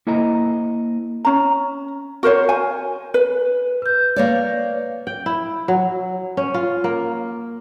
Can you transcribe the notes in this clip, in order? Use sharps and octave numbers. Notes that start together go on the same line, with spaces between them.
A#3 E4 A4 C5 D#5 A#5
C#4 A#5
F#4 A#4 C5 C#5
G#5
B4
B4 G6
A#3 C#5 D5
G5
E4
F#3
C#4
F4
A#3